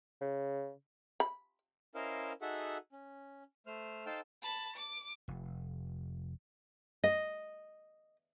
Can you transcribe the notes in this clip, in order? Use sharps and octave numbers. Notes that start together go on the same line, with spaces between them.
C#3
B5
C#4 E4 A#4 C5 D#5 F5
D#4 F#4 G#4 A4 E5 F#5
C#4
A3 C5 F6
D#4 A4 C5 F5 G5 A5
A5 B5
D6
F1
D#5